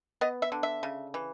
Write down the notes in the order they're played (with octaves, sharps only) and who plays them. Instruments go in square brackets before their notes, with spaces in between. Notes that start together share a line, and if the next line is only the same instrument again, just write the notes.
[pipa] B3 D#5
E5
D3
E5
C#3
E3